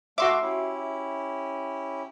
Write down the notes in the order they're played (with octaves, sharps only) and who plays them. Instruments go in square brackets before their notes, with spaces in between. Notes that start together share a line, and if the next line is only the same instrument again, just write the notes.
[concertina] A3 F5 [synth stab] F#4 C6 D6 [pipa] E5
[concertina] C#4 E4 G4